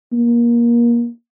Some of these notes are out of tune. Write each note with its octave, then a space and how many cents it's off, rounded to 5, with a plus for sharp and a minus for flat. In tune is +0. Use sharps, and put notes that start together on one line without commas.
A#3 +25